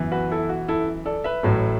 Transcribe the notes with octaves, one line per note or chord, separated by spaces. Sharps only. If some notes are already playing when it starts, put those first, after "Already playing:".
Already playing: F#2 E3 B3
F#4 B4
E4 A4
F#4
E4 A4
A4 D5
B4 E5
A1 A2 F#3 A3